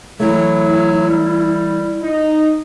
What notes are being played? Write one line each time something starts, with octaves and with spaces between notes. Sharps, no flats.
E3 F#3 A3 E4
G3
D#4